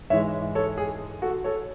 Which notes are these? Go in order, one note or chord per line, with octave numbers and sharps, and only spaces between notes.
G#2 E3 G#3 C#5 E5
A4 C#5
G#4
F#4 A4
A4 C#5